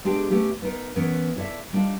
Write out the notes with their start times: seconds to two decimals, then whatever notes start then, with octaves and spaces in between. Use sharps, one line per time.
0.05 G#3 B3 D4 G4 G#4 G5
0.30 A3 B3 C#4 G4 A4
0.62 B3 D#4 A#4
0.96 E3 B3 C#4 A#4
1.36 E4 A4 B4 D5 E5
1.73 G3 D4 D#4 F4